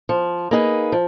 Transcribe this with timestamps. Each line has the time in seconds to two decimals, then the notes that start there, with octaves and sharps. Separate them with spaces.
0.09 F3
0.51 A#3 D#4 G#4 B4
0.92 F3